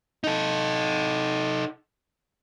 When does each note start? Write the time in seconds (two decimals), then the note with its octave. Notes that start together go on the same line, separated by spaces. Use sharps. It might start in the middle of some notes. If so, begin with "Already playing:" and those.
0.24 D#4 A4